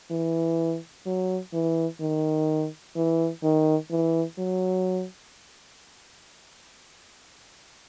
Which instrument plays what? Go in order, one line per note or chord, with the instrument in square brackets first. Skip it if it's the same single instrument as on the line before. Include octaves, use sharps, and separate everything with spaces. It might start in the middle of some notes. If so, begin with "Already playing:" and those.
[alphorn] E3
F#3
E3
D#3
E3
D#3
E3
F#3